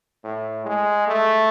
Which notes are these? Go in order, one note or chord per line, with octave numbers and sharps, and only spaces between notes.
A2
G#3
A3